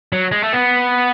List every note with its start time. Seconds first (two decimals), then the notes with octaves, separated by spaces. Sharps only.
0.12 F#3
0.32 G#3
0.43 A3
0.53 B3